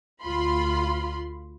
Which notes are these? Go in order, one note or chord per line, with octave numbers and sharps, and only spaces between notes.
D2 F4 B5 C6